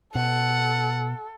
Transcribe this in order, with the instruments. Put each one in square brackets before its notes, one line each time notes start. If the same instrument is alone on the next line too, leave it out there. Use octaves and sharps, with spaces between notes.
[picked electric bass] B2 [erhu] A4 [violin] F#5